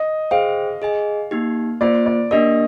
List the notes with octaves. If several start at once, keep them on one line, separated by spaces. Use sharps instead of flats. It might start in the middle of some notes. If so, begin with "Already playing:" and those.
Already playing: D#5
G#4 C5 F5 G5
G#4 D#5 G#5
A#3 D#4 G4
A#3 F4 C5 D5
D5
A#3 D4 G4 A#4 D#5